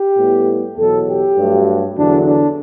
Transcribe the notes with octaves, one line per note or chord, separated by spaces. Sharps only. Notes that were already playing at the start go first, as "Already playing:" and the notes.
Already playing: G4
A2 G3 B3
E2 B2 F#3 A4
G4
G2 F#3 A3
E2 D3 F#3 D4
D4